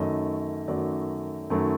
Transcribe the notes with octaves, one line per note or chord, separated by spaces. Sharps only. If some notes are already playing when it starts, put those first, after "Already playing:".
Already playing: F#2 D#3 F#3 A3 D#5
F#2 D#3 F#3 A3 D5
F#2 D#3 F#3 A3